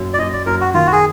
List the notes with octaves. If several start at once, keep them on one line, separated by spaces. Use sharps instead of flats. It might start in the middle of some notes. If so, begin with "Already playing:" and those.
Already playing: F#2
D5
F#2 D#5
D5
F#2 A#4
F#4
D#3 F4
F#4
G#4